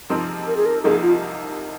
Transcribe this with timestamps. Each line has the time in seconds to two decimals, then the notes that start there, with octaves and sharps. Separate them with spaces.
0.10 C3 F3 C4 D#4 A#4
0.47 A#4
0.56 G#4
0.66 A#4
0.83 C2 C3 F3 A#3 D#4 G#4
1.02 F4